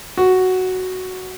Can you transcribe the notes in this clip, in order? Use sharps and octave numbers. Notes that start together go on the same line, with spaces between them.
F#4